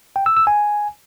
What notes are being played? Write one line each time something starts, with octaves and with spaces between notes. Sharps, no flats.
G5
E6
E6
G#5